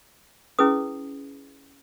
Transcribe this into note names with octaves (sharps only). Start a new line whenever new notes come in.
C#4 E4 G#4 B4 D#6